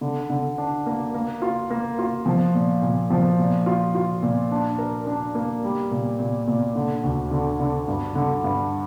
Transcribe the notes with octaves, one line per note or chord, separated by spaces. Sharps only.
D3
D3
D4
A#3
A#3
F4
A#3
F4
F3
A#2
A#2
F3
A#2
F4
F4
A#2
D4
A#4
D4
A#3
G3
A#2
A#2
A#2
D3
D2
D3
D3
G2
D3
G2